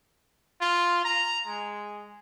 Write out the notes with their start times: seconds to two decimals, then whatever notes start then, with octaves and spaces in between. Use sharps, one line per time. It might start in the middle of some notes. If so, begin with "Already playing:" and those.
0.61 F4
1.05 A#5
1.47 G#3